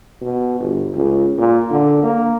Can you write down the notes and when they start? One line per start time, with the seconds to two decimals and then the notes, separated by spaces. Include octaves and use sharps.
0.21 B2
0.60 G1
0.95 C#2
1.38 A#2
1.71 D3
2.03 A#3